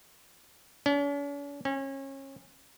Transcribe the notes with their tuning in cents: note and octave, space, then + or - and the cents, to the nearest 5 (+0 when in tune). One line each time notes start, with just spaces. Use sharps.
C#4 +45
C#4 -30